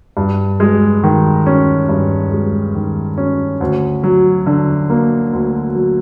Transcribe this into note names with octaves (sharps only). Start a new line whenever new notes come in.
G2
G#3
D#3
C#4
G2
G#3
D#3
C#4
D2
F#3
D3
A#3
D2
F#3